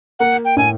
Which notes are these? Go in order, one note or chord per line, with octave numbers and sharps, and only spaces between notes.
A#3 F#5
G5
A2 G#5